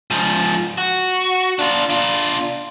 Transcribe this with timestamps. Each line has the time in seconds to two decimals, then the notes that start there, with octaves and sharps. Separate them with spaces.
0.10 G#2 F3
0.78 F#4
1.59 D4 F4
1.90 D4 F4